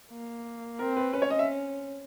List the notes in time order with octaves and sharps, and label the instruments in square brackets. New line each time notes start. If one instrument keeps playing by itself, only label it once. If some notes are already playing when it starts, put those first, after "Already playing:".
[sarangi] A#3
[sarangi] C4 [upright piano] A#4
[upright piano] B4
[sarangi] C#4 [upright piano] B4
[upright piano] C#5
D#5
E5